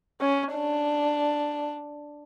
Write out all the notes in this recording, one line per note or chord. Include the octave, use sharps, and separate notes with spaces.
C#4
D4